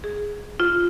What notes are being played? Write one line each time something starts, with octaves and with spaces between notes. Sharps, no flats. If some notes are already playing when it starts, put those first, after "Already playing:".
G#4
F4